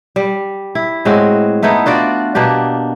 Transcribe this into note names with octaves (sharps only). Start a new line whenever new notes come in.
G3
E4
A2 G#3 C4 F#4
A3 B3 D#4 E4
D4 F4 F#4 D5
B2 A#3 D4 G4